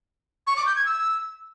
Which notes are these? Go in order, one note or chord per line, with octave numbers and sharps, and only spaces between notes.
C#6
D6
G6
G#6
E6